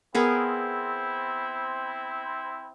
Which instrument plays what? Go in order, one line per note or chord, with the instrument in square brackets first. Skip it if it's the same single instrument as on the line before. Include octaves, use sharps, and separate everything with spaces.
[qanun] B3 G#4 A#4 [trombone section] C4 E4